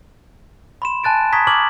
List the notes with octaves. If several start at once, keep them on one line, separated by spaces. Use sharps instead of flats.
B5 C6 E7
G#5 A5 F#6 A6 D7
A#5 B5 C#6 D#6 G#6 B6
C#6 D6 F6 G#6 F#7